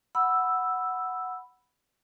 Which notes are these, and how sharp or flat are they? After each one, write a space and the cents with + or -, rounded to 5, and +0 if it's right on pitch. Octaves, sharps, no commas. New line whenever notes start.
F#5 +0 B5 +0 E6 +0